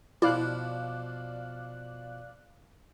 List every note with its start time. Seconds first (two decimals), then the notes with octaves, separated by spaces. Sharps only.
0.22 B2 F3 E4 D5 F5 F#6